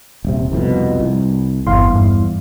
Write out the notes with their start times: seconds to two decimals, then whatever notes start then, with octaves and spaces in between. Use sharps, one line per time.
0.25 D#1 C3
0.52 C2 F2 B2
1.00 C2
1.67 G1 E2 F5 C6
1.90 G2